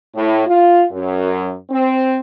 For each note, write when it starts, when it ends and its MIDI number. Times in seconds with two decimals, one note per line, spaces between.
0.15 0.43 45
0.47 0.84 65
0.91 1.53 42
1.70 2.19 60